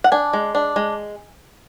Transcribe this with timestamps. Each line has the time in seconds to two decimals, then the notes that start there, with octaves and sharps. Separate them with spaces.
0.04 F#5
0.12 D4 G#5
0.33 G#3
0.55 D4
0.76 G#3